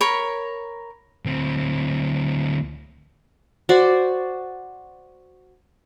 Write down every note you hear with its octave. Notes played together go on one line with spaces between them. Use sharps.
A#4 C#5 B5
D2 C4
F#4 C5 D5